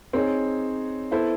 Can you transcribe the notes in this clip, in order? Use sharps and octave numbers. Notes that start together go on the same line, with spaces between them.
C4 D#4 G#4 C#5
B3 E4 A4 C5